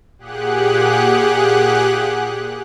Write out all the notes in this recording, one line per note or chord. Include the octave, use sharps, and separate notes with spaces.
A#2 G4 G#4 F#5 F#6